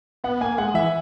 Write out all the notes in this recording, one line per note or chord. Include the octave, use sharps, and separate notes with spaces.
B3 F#5
A#3 G#5
G#3 F#5
E3 E5